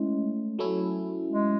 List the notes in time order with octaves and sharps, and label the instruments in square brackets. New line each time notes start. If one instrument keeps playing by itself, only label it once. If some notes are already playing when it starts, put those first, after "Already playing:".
Already playing: [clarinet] G#3 [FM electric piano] A3 C#4 E4
[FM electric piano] F#3 A3 C#4 E4
[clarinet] G#3